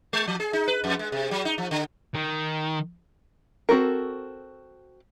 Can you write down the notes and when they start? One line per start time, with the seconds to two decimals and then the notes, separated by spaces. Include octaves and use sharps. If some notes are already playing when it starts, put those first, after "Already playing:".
0.13 G#3
0.28 F3
0.40 G#4
0.53 D#4
0.68 B4
0.84 F2
0.99 G#3
1.12 C3
1.31 F#3
1.45 D#4
1.58 F3
1.71 D3
2.14 D#3
3.69 C4 F#4 A4 A#4